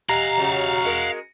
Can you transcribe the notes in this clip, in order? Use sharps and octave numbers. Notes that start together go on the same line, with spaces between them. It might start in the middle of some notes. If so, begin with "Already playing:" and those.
G4 D#5 F5 F#5 G#5 A#5
C#3 F#3
G#3 A#4 A#6 C#7